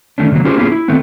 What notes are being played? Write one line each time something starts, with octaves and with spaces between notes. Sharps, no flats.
D#3 A3 C#4 D4
C3 D#3 F3 F#3 A#3
C#4 F4 G4 G#4 A#4 C5
A#3 B3 C#4 F4 G4 G#4
E4
D#3 A3 B3 C4